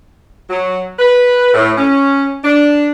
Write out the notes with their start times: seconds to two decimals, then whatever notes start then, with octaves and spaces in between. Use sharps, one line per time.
0.50 F#3
0.99 B4
1.54 A2
1.78 C#4
2.44 D4